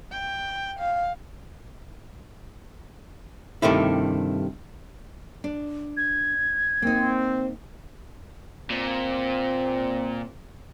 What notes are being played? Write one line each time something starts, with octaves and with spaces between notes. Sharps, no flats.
G5
F5
G2 C3 D#3 A3 E4
D4
G#6
A#3 C4 D#4
A#2 C4